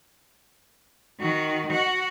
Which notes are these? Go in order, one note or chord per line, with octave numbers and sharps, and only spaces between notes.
D#3 F#4
F#4 F#5